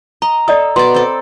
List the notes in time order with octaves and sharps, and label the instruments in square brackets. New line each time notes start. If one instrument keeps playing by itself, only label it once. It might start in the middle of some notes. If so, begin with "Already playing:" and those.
[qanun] D#5 [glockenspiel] A#5
[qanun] A4 [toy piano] D5 D#5 D#6
[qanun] B2 D5 [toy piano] C6
[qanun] C4 A4